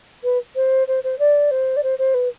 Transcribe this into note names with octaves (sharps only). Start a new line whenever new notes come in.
B4
C5
C5
C5
D5
C5
D5
C5
C5
B4